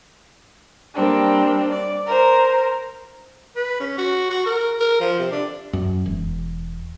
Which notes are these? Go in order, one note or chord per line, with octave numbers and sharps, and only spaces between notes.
G3 A#3 C4 D4
D5
A#4 C5
B4
C#4
F#4
F#4
A#4
A#4
F3
C3
D4
F#2
E1